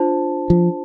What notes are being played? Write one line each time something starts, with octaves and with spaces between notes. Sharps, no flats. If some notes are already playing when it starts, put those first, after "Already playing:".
Already playing: D4 F4 C5 A5
F3